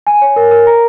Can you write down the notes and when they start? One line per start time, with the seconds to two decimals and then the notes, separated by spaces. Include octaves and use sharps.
0.07 G#5
0.22 C#5
0.36 A#4
0.51 A#4
0.67 A#5